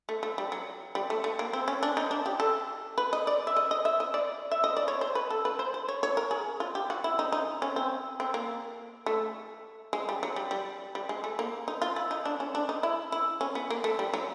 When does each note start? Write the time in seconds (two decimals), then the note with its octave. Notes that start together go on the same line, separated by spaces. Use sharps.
0.09 A3
0.23 A3
0.38 G3
0.52 F#3
0.95 G3
1.10 A3
1.24 A3
1.39 A#3
1.53 C4
1.68 C#4
1.83 D4
1.97 D#4
2.11 D4
2.26 G4
2.40 A4
2.98 B4
3.13 D#5
3.27 D5
3.47 E5
3.57 D#5
3.71 D#5
3.85 E5
4.00 D#5
4.14 D5
4.51 E5
4.64 D#5
4.77 D5
4.88 C#5
5.01 C5
5.15 B4
5.30 A4
5.45 B4
5.59 C5
5.74 C5
5.88 C#5
6.03 C#5
6.17 A#4
6.31 G#4
6.60 F4
6.75 G4
6.90 F#4
7.04 E4
7.19 D#4
7.32 D#4
7.62 C#4
7.76 C4
8.20 C4
8.34 A#3
9.06 A3
9.93 G#3
10.09 G3
10.23 F#3
10.36 G3
10.51 G3
10.95 G3
11.09 G#3
11.24 A3
11.39 A#3
11.68 D#4
11.82 F4
11.96 E4
12.11 D#4
12.25 D4
12.40 C#4
12.55 D4
12.69 D#4
12.83 E4
13.12 E4
13.41 C#4
13.55 B3
13.70 A#3
13.84 A3
13.99 G3
14.14 F#3